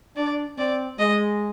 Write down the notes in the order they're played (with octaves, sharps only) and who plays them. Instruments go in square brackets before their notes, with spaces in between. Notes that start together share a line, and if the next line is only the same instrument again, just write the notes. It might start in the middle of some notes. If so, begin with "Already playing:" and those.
[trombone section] D4 [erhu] D5
[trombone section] C4 [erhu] D5
[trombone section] G#3 [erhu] D#5